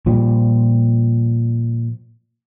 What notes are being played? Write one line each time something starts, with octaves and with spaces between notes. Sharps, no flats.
A#2 F3 G3